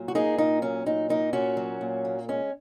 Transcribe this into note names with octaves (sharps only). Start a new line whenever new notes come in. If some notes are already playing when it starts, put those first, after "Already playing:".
Already playing: A#2 F#3
F#4
A#3 D#4 G#4
A#2 D#4
F#3 C#4
A#2 D#4
A#3 D#4
A#2 C#4 F#4
F#3
A#2
A#3
G#3 C#4